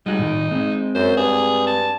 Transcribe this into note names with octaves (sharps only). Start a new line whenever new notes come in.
G3 G#3 D#4 F#4
A2 D#3
G#3 C4
F#2 C5
G2 G#4
A5